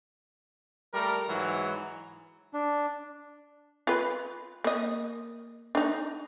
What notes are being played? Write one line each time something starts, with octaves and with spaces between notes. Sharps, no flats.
G3 A3 A#4
G#2 E3 F#3
D4
F4 B4
A#3 D#5
D4 D#4